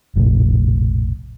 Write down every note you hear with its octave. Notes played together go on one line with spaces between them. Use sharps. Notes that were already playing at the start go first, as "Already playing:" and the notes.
F1 A#1 A2